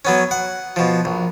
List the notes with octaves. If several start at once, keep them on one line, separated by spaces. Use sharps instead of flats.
F#3 B3 C#4
F#5
B2 F3
A#1